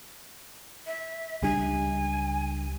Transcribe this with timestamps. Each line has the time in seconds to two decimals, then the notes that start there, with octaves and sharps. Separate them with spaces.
0.87 E5
1.42 C#2 G3 D4 G#5